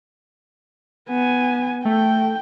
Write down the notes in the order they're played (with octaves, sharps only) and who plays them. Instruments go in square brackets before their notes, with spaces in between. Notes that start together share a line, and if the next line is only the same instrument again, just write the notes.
[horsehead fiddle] B3 G#5
[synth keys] A3 [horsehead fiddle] G5